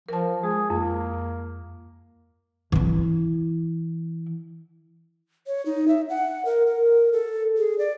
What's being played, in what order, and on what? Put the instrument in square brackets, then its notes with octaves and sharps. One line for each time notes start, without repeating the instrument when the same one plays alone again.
[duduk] F3 [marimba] A#4 A5
[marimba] G#3 [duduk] G#4
[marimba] F2 [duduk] A#3
[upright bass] E3 E4
[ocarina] C#5
D#4
E5
F#5
A#4
A#4
A4
G#4
D5